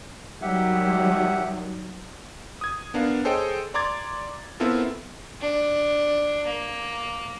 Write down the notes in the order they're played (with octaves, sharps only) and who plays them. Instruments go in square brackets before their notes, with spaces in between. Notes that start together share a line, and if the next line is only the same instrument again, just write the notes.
[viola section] D#3 F#3 G3 [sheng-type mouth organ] G4 E5 F#5
[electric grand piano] D#6 G#6
B3 D4 A#4 F5
G#4 A4 C5 C#5 D#5 G5
D5 A#5 C6 D6 G#6 A6
B3 C4 E4 F4 A4 A#4
[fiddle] D4
A#3